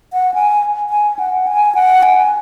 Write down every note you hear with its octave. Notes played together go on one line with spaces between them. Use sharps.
F#5
G#5
G#5
F#5
G#5
F#5
G#5